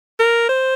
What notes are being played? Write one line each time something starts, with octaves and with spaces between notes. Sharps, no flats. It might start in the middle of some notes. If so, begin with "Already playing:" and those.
A#4
C5